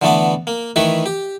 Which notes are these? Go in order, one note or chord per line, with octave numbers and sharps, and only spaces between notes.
D3 E3 A3 B3 A5
A#3
D#3 E3 A3 E4 A4 B4
G4